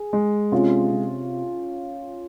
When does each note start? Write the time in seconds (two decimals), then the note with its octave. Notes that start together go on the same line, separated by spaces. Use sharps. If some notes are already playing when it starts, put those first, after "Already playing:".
Already playing: G#4
0.13 G#3
0.52 C3 C#4 F4
0.91 C3